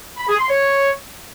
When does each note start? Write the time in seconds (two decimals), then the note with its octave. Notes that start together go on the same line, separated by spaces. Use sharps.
0.18 B5
0.28 G#4
0.39 C6
0.50 C#5